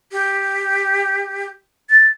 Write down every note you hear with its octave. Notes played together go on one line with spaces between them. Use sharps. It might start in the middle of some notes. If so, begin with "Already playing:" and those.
G4
A6